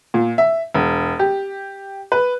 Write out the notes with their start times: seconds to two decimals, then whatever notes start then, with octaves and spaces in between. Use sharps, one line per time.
0.14 A#2
0.38 E5
0.74 E1
1.19 G4
2.12 B4